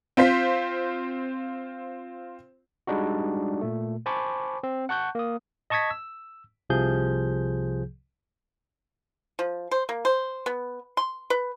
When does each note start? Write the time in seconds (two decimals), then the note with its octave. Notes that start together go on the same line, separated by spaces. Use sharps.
0.17 C4 F4 C5 B6
2.87 G3 G#3 D4 D#4 F#4
3.61 A#2 A3
4.06 C5 G#5 A5 B5 C#6 D6
4.63 C4
4.89 F#5 A5 C#6 F#6 G6
5.15 A#3 D#6
5.70 D#5 A5 C#6 D#6 G#6 B6
5.90 E6
6.70 C2 C3 F3 G#4 G6
9.39 F3
9.71 C5
9.89 A#3
10.05 C5
10.46 B3
10.97 C6
11.30 B4